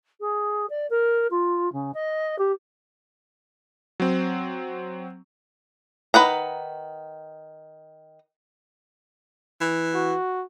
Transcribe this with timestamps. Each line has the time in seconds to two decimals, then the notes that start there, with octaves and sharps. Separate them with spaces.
0.20 G#4
0.69 D5
0.90 A#4
1.30 F4
1.72 C#3
1.94 D#5
2.38 G4
4.00 F#3 C4
6.14 D#3 B4 F#5 A#5
9.61 E3
9.95 F#4